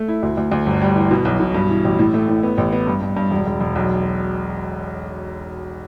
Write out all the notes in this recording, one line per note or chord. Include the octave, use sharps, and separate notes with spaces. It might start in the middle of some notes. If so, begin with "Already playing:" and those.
Already playing: A3
E4
D2
D2
D2
G1
G3
E3
B2
B1
B2
G2
E3
A1
A2
A3
A2
B3
A1
B3
G2
G2
G2
E1
E1
E1
B1